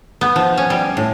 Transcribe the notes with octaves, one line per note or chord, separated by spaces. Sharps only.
B3
F3
C#4
G3
A2